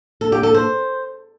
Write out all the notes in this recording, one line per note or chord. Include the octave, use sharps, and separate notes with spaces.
A4
G4
A4
C5